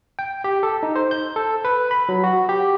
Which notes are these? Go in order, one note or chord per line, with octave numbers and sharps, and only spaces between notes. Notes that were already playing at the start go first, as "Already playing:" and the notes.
G5
G4
A4
D#4
C5
G6
A4
B4
B5
F#3
F#4
G4